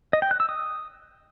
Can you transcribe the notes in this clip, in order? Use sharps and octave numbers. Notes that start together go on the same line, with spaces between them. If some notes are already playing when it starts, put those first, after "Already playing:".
D#5
G5
F#6
E6
D#6